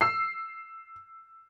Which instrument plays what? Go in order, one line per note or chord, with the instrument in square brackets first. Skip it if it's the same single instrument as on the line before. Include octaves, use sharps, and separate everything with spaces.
[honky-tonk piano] E6 C7